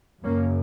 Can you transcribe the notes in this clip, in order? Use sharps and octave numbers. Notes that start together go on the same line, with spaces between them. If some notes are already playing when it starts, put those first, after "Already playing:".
F#2 C#3 A#3 C#4